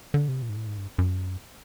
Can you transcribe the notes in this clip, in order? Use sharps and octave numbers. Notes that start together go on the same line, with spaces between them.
D3
C3
A#2
G#2
A2
G#2
G2
F#2